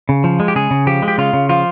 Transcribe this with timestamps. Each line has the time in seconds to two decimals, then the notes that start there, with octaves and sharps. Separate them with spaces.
0.09 C#3
0.24 F3
0.40 G#3
0.48 G4
0.55 C#3 G#4
0.71 C#3
0.87 F3 G4
1.02 G#3
1.08 G4
1.18 C#3 F4
1.33 C#3
1.49 F3 F4